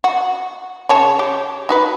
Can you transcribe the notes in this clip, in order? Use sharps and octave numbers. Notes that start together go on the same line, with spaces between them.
F#4
C#3 C#5 A5
G4
D#4 F#4 B4